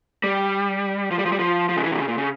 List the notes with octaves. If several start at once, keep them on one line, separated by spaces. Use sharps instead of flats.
G3
F3
G3
F3
G3
F3
F3
C#3
E3
C3
C#3
A#2
C#3